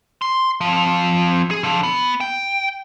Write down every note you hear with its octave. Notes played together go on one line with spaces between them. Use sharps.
C6
F3 C4
G#4
D3 F3
B3
G5